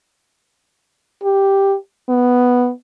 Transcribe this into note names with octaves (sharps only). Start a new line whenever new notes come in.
G4
B3